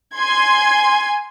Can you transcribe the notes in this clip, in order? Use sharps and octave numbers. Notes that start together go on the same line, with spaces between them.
G#5 C6 G#6